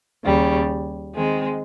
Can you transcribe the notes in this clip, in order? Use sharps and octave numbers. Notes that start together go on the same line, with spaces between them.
D#2 C#3 G3
D#3 G#3 C4